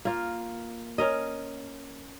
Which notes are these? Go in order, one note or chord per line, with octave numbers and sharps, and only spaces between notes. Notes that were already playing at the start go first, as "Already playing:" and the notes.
A#3 F4
C#4 A#4 D#5